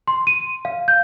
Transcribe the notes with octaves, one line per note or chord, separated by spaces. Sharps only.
C6
D#7
F5
G6